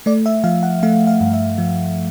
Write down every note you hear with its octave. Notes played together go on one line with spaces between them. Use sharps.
A3 D5
E5
F3 F5
F#5
A3 F5
F5
G2
E5
F3